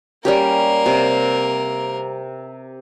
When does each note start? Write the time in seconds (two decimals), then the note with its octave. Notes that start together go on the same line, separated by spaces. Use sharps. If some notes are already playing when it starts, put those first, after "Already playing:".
0.25 G3 A#3 C#4 G4 A#4
0.86 C3